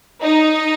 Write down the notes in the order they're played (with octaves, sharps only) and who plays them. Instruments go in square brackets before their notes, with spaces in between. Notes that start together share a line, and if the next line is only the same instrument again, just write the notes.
[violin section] D#4